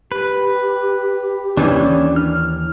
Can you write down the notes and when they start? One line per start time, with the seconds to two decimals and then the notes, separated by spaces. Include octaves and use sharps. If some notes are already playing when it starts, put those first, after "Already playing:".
0.12 G4 B4
1.57 D#2 E3 C#4 D4
2.16 F6